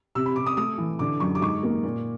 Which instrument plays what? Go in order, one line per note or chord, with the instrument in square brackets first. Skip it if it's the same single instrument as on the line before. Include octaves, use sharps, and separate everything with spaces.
[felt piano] C3 E6
B5
C3 D6
D#6
A3 D#6
E3
D3 D6
F#2 C#6
D6
G#2 C#6
A#3
A#2